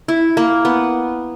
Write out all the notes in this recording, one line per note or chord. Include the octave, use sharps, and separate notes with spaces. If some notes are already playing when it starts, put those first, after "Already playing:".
E4
A#3
B3